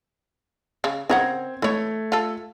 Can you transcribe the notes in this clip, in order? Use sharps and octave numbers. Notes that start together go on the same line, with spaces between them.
C#3
C#3 C4 A#4 F#5 G#6
E3 A3 C#5
F4 A4